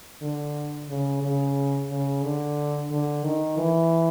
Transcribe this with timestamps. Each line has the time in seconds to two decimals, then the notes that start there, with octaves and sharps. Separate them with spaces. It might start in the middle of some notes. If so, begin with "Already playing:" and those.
0.22 D3
0.89 C#3
1.23 C#3
1.90 C#3
2.24 D3
2.92 D3
3.24 D#3
3.58 E3